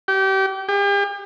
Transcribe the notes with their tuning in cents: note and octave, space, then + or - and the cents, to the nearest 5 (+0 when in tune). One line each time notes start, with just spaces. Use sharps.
G4 -30
G4 +40